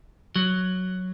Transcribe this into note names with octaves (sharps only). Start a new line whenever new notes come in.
F#3